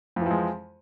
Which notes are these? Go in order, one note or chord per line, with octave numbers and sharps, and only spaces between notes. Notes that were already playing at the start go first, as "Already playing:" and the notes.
F2 E3 F3 G#3